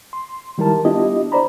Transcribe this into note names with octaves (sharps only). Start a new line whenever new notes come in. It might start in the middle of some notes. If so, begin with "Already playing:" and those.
C6
D#3 G3 E4 A#4 A5
B3 D4 E4 F4 G4 D#5
C5 D5 A#5 B5